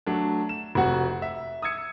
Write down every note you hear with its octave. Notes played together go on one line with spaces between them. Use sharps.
F#3 A3 D4
E7
F1 C4 F#4 F#5
E5
D#6 E6 G#6 C#7